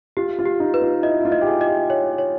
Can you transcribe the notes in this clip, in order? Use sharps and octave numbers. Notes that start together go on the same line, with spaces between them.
F4 G4
F4
G4
D#4
B4
F4
E4 D#5
E4
F4
D#5
G4
G#4
D#5
G4
C#5
C#5